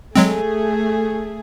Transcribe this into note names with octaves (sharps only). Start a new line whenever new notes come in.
F#3 G#3 A3 C4 G#4